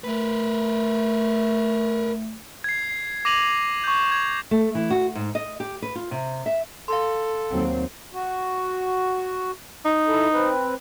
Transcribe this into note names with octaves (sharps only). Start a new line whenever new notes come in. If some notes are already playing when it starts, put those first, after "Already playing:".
A3 A#4 B4
G#6 C7
C7
D6 A#6 D#7 F7 F#7
C#6 G6
G#6
A3
E3
F#4
G#2
D#5
G4
B4
F4
C3
E5
A4 F5 C6
D#2 F#3 C4
F#4
D#4
E4 A4
C4 B4